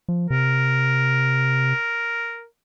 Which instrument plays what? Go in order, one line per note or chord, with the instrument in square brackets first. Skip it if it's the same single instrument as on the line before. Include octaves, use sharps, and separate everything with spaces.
[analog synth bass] F3
[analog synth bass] C3 [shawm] A#4